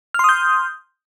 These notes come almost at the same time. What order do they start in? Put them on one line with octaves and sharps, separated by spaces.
F6 C6 D#6 G6